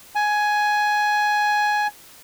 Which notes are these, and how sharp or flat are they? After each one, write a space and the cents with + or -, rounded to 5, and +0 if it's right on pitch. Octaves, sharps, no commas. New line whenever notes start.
G#5 +10